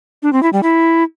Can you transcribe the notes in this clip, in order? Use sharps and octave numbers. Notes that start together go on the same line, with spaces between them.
D4
C4
E4
G3
E4